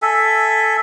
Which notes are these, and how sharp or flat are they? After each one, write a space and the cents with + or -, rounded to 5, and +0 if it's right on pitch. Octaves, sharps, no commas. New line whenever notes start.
A4 +0 E5 +5 G#5 +0